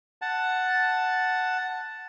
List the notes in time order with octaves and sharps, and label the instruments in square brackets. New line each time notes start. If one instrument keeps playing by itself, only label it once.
[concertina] F#5 A5